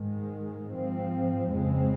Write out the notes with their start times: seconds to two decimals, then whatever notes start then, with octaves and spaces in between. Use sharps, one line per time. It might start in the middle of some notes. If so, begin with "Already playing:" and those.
Already playing: G#2 D#3 G#3
0.73 G#2 F3 C4
1.51 F2 C#3 G#3 C4